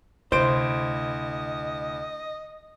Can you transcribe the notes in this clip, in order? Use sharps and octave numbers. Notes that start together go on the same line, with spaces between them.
D2 C3 E4 C5 D#5 D7